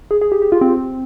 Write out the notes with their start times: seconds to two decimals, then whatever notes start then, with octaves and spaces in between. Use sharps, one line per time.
0.11 G#4
0.21 G#4
0.32 G4
0.42 G4
0.52 F4
0.61 C4